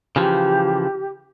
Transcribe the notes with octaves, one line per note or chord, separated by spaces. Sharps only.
C#3 E3 F3 G4